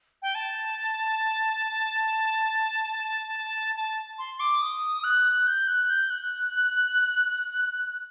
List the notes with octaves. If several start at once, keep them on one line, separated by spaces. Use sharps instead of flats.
G5
A5
A5
C6
D6
D#6
F#6
G6
F#6
G6
F#6